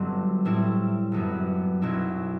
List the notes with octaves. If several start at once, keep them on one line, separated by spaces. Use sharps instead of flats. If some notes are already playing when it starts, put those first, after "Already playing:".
Already playing: G1 G2 F#3 C4
A2 G3 C4 E4
G1 F#2 F#3 B3
B1 B2 F#3 C4 E4